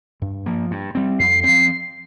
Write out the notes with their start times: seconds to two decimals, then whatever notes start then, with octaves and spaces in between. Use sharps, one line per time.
0.22 G2
0.46 F3 A#3
0.71 G2
0.95 G3 C4
1.19 F2 C7
1.44 F3 C4 C7